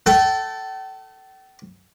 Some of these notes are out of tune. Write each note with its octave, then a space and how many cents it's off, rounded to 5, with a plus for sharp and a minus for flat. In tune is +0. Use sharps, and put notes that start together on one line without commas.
A4 +0 G5 -40